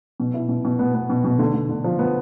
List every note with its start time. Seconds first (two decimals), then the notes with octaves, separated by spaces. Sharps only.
0.20 B2
0.34 E4
0.49 B2
0.65 B2
0.79 B3
0.94 B3
1.10 B2
1.24 B2
1.39 D3
1.54 D3
1.69 D3
1.84 F3
1.99 B3